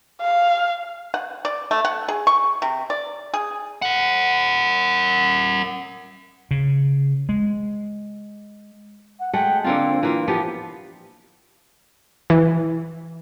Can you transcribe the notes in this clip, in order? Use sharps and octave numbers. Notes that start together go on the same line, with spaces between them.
F5
F#5
D5
A3
F#5
G#4
C#6
C3
D5
G#4
A#4 F#5
C#3
G#3
F#5
G#3 A3 F#5 G5
D3 A#3 C4 F4
E3 A#3 F4
F3 B3 G4
E3